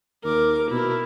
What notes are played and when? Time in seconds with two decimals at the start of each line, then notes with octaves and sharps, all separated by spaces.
0.24 D#2 A#4 D6
0.71 B2 E4 A#4